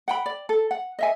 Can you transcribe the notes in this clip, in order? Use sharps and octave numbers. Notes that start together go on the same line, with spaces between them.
F#5 G5 B5
D5
A4
F#5
D#5 E5 G#5